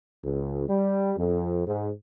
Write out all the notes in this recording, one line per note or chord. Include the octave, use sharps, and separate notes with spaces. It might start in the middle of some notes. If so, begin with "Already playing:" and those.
C#2
G3
F2
G#2